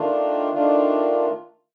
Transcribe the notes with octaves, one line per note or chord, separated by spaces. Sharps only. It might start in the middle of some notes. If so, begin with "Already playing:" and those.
Already playing: D#3 A3 D4 F4
D#3 A3 D4 F4